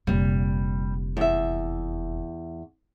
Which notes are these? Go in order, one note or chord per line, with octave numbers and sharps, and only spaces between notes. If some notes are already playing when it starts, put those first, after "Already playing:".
F1 A#2 G3
E2 E5